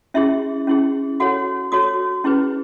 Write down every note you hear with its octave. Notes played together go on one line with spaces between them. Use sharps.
C#4 E4 G#4 E5
C#4 E4 G#4
F#4 A4 C#5 F#5
F#4 A4 C#5 D#6
C#4 E4 G#4 B4